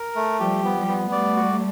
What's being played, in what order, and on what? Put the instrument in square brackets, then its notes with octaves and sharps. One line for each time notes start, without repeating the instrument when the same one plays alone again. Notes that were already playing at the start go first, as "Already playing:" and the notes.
Already playing: [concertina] A#4
A3
[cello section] F3 G3 [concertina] G4
[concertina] B3
[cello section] F3 G3
[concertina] B3
[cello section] G3 A3 [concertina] D5
[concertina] F#4